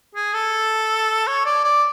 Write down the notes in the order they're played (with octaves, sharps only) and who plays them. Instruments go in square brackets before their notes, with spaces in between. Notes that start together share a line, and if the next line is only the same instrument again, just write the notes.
[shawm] G#4
A4
C#5
D5
D5